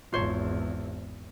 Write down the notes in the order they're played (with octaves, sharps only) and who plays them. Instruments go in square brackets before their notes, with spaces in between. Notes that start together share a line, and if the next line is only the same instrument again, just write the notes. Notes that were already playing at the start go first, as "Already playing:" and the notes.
[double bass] G#1 E2 [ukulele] F4 C5 C#5